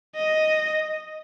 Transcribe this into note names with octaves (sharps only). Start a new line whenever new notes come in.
D#5